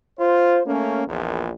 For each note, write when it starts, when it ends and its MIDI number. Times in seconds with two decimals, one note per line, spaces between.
0.18 0.60 65
0.18 0.60 72
0.65 1.01 57
0.65 1.01 58
0.65 1.01 61
1.07 1.51 34
1.07 1.51 40
1.07 1.51 46